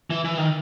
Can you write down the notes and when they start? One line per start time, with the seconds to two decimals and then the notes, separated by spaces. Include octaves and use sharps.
0.10 E3
0.25 E3
0.38 D#3